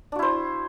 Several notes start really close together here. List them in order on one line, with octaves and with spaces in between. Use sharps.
D4 F#4 E4 C5